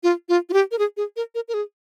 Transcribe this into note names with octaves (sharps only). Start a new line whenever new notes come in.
F4
F4
F4
G4
A#4
G#4
G#4
A#4
A#4
A#4
G#4